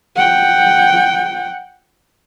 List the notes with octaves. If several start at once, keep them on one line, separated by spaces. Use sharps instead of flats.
F#5 G5